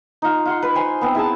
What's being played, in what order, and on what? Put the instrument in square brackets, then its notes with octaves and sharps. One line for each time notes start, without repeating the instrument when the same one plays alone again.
[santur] D#4 F4
F4 F#5 C6
B4
C5 G#5 C6
B3 C4 G#5
E4 G#4 G#5 A5